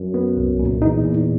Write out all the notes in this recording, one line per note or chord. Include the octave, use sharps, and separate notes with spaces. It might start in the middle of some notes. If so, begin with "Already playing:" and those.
Already playing: F#2
B3
C2
A#2
E2 D#4
A#2